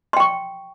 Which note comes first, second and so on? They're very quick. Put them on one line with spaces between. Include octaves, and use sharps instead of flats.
C6 G5 C#6